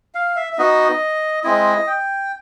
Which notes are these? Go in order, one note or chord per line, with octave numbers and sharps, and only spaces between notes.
F5
E5
E5
B3 D#4 F#4 D#5
G#3 C4 E4 D#5
G5